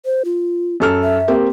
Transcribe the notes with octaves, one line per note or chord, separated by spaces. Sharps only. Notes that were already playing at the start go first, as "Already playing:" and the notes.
C5
F4
F#2 A4 F6
E5
A#3 C4 G4